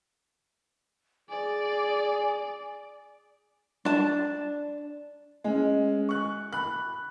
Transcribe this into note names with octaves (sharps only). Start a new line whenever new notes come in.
G#4 D5 G#5
D4 A5
G#3 C#4
C#6 F#6
B5 F#6